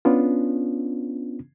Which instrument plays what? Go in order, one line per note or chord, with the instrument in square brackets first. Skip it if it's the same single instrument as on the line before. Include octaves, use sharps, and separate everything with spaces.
[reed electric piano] B3 C#4 D4 F4